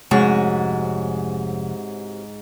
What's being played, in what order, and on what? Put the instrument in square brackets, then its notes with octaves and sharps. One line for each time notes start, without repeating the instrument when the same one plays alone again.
[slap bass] F1 [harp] G#2 [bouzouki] C3 C#4 F#4